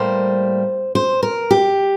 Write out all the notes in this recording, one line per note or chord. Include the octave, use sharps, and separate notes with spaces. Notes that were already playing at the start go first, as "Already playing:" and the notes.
Already playing: A2 G3 A#3 C5
C5
A#4
G4